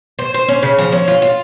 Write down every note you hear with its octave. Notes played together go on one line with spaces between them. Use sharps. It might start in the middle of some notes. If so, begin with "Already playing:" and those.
C5
C5
C#4
C#3
F3
C#4
F4
F4